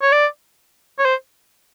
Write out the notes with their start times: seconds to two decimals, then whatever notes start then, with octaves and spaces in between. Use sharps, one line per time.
0.02 C#5
0.12 D5
0.99 C#5
1.05 C5